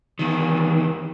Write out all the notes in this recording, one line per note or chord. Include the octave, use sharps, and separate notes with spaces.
E2 D#3